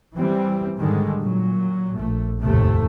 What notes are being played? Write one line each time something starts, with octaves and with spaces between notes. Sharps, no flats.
E3 G3 C4
G#2 D3 D#3 G3 G#3
A#2 F#3
A#1 A3
F1 D#2 A2 C3 A3